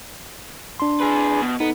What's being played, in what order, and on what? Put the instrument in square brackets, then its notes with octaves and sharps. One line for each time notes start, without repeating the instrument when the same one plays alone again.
[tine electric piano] D4 C6
[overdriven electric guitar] G#4 B4
B2
[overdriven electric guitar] B3 [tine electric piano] D#4 A4